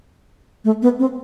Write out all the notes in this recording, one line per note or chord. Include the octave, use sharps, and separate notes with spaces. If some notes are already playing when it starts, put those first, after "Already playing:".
A3
B3
C4